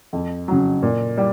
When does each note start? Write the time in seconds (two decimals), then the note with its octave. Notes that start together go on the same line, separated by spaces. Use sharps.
0.13 F2
0.48 C#3 F#3
0.83 A#2
1.17 G3